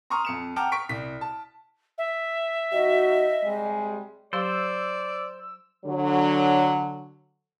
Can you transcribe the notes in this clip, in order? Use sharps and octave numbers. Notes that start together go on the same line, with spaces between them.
A#5 C6 C#6 D#6 F6
F2 C#7 E7
F#5 G5 A5 A#5 D6 F6
C#6 B6 D7
C2 B6
A5
E5
F#3 D#4 F#4 D#5
C3 G3 G#3
F#3 G4 C5 D5 F5 E6
D3 F#3